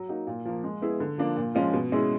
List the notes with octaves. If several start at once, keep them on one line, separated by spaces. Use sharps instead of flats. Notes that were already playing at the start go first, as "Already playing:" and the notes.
Already playing: F#3
A#3 D#4 F#4
A#2
F3 A#3
G#3
B3 E4 G#4
D3
F3 A#3 D4
A#2
F3 G#3 C#4 F4
B2
G#3 C#4 E4 G#4